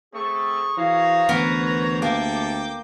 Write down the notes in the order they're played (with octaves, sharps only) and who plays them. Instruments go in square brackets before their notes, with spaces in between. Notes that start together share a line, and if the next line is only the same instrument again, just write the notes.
[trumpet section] A3 C4 A4 [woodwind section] G#4 C#6
[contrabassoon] E3 [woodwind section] F#4 G#4 F5 [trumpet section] C5 C#5 A#5
[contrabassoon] D2 [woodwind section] E3 [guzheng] B3 A#4
[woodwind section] C3 A4 A5 [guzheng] A#3 [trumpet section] G5 D6